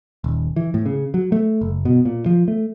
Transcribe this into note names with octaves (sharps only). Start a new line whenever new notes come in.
D#1
E3
A2
C#3
F#3
A3
F#1
B2
A#2
F3
A3